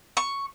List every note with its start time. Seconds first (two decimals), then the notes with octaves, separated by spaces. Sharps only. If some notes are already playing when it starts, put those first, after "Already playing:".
0.17 C#6